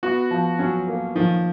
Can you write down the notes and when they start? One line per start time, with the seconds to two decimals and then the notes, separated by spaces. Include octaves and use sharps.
0.03 B3 F#4
0.31 F3
0.59 F#3 C#4
0.88 A#3
1.15 D#3 F3